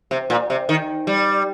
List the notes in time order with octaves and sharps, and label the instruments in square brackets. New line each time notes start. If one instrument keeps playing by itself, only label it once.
[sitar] C3
A#2
C3
D#3
G3